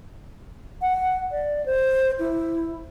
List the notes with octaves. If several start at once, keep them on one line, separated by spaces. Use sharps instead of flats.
F#5
D5
C5
E4